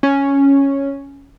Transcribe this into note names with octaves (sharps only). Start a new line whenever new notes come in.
C#4